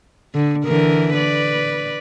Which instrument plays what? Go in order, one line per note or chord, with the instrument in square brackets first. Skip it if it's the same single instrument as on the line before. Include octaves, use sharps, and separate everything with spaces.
[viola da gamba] D3
D3 E3 A#4
B4 D5